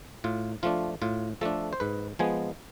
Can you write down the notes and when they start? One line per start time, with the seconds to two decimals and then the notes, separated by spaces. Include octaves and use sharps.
0.24 A2 F4
0.63 F3 A3 D4 F4
1.02 A2 F4
1.41 F3 A3 D4 A4
1.73 C5
1.80 G#2 B4
2.19 F3 G#3 B3 G#5